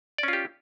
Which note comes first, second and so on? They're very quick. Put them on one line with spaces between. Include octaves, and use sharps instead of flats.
D5 C#4 F4 G4